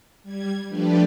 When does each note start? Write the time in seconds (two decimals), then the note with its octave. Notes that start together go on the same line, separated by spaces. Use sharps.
0.23 G3 G#6
0.69 F3 A3 D4 G4 B4 D5